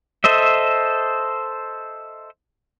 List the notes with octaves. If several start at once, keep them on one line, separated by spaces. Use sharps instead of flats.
A4 C5 D#5 E5